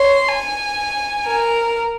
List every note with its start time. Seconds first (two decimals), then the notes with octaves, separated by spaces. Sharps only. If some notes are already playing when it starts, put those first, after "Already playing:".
Already playing: C#5 C6
0.29 G#5
1.27 A#4